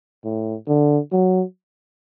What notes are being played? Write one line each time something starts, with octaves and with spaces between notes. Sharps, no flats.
A2
D3
F#3